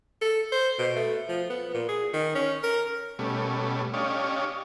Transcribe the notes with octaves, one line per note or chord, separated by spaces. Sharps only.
A4
C5
B2
A3
F3
B3
A#2
G#4
D#3
C#4
A#4
B2 G3 A3 C#4
C#4 D4 G4 C#5 D#5 F5